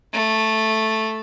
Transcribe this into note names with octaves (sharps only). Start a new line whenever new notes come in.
A3